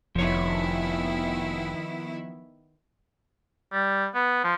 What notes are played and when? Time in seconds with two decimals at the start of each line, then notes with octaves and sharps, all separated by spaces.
0.15 F1 D#3 F3 B3 E4 C#5
3.73 G3
4.15 B3
4.44 F3